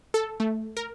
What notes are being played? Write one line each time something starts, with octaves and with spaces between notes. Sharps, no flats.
A4
A3
A#4